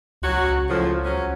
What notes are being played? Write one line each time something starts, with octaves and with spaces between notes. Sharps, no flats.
C#2 F#3 F#4
C#2
A2 C#3 F3
F#3 C#4